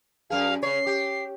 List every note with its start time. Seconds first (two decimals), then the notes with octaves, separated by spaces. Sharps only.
0.30 F#2 G#4 F5
0.63 C#3 C#5 C7
0.87 G4